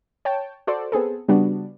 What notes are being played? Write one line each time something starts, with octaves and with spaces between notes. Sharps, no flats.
C#5 G5 A5
F#4 A4 C5 D5
B3 C4 G#4 A4
C#3 G3 B3 D4 F#4